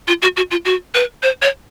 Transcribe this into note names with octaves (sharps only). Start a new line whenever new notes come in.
F4
F#4
F#4
F4
F#4
B4
C5
C#5